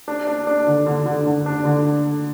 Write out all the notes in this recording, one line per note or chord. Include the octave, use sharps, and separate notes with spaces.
D4
D4
D4
D3
D3
D3
D3
D4
D3